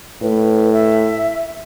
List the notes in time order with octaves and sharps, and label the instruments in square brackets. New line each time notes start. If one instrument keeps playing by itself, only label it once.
[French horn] A2 [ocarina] B4
[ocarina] E5